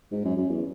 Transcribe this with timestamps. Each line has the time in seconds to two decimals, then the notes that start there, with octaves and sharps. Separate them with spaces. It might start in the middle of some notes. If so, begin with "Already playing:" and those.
0.12 G#2
0.24 F#2
0.37 F#2
0.49 E2